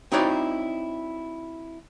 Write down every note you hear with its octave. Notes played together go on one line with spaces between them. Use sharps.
C4 D#4 E4 F#4 C#5 D5